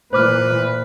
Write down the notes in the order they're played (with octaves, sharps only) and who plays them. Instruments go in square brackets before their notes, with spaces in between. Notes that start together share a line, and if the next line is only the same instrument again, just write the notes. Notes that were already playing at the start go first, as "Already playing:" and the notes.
[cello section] A#2 E3 [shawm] B4 [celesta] C5 D6 F6